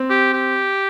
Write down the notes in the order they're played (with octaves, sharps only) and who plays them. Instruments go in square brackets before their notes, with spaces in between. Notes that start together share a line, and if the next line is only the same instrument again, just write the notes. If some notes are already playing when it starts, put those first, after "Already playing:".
Already playing: [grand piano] C4
[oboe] G4
G4